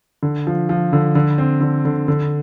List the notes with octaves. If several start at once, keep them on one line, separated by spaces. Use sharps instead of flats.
D3
F3
F3
D3
D3
C4
D3
D3
D3